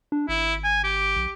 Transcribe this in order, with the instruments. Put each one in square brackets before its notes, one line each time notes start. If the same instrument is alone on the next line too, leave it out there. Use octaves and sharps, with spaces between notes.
[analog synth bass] D4
[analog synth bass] G#1 [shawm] E4
[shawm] G#5
G4
[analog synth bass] B1